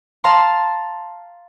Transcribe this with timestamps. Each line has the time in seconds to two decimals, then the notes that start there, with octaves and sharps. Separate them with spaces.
0.24 F5 A5 A#5 C6